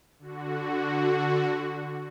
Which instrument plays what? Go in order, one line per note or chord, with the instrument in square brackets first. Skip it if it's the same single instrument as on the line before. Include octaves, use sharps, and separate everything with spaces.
[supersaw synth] D3 F#4